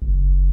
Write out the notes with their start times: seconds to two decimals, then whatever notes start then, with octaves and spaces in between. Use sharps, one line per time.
0.02 F#1